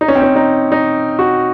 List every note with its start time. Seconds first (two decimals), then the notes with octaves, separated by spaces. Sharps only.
0.01 D#4
0.08 C#4
0.16 C4
0.22 C#4
0.36 D#4
0.72 D#4
1.19 F#4